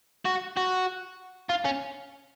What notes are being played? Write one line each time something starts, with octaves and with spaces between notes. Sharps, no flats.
F#4
F#4
F4
C#4